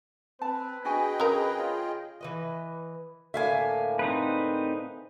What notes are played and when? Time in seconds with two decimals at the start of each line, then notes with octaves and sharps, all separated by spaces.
0.42 C4 B4 A5
0.85 D4 F#4 G#4 D#5 G5 G#5
1.20 C#3 A#4
1.58 F4 C#5
2.21 E3 B4 D#5
3.34 A2 D3 A#3 E5 F5 G#5
3.99 C4 D#4 B4